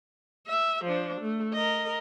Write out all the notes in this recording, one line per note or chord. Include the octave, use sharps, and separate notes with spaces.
E5
F3 D4
A3
A#4 D#5